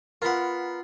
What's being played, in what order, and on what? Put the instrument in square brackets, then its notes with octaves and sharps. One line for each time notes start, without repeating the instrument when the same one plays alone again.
[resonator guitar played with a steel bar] B3 A#4 [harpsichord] F4 F#5